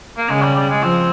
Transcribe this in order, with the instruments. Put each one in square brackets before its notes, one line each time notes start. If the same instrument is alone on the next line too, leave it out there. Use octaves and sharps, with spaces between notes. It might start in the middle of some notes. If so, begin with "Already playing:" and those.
[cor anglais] A#3
[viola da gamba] C#3 [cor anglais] G#3
[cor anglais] G3
G3
G#3
[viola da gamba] F3 [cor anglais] C4